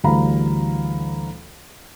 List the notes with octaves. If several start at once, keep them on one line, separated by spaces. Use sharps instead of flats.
D2 E3 G3 F5 A#5 B5